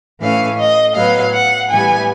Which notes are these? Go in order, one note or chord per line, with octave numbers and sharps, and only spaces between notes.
A2 E3 A3 C#4 F5
D#5
A2 F#3 B3 F5
F#5
A2 E3 G3 B3 G#5